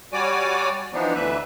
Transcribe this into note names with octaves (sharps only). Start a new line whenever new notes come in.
G3 F#4 C#5 D5 G#5 D6
E3 F3 B3 D4 D#4
D2 E3 B4 E5